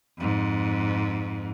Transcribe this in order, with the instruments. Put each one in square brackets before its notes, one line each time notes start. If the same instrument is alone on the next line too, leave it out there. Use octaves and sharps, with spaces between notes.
[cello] F2 G#2